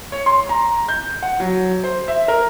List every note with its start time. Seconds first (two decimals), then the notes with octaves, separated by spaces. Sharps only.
0.12 C#5
0.26 C6
0.49 A#5
0.88 G6
1.23 F#5
1.40 F#3
1.84 C5
2.08 E5
2.28 A#4